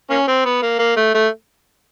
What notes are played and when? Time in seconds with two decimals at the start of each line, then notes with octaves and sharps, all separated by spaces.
0.10 A#3 C#4
0.28 C4
0.45 B3
0.63 A#3
0.79 A#3
0.97 A3
1.14 A3